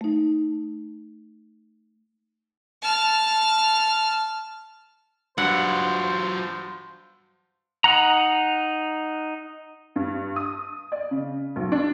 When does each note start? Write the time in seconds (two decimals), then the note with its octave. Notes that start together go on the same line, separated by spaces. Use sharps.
0.01 A3 D#4
2.82 A5 F6
5.38 G2 F#3 F4 C5 F#5
7.84 D#4 F#5 A#5
9.96 G2
10.36 D#6
10.92 D5
11.11 C#3
11.56 B1
11.72 D4